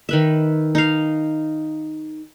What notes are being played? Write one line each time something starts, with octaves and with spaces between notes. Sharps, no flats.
D#3 B4 E5
D#4 F5